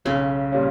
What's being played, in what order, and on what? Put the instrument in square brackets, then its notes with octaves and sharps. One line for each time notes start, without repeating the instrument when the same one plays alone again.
[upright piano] B1 [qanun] C#3
[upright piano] A#2 G3 A#3 C#4